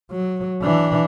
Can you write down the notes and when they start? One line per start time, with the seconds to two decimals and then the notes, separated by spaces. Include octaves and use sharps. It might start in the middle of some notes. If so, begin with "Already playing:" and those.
0.11 F#3
0.63 E3 D4